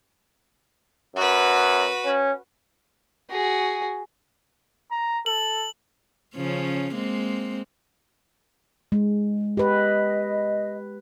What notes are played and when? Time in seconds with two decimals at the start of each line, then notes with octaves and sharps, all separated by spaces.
1.16 F#2 F#4 B4
2.05 C#4
3.30 F#4 G#4
4.91 A#5
5.26 A4 F#7
6.36 C#3 F3 C#4
6.94 G#3 A#3 C4
8.92 G#3
9.57 G4 B4 D#5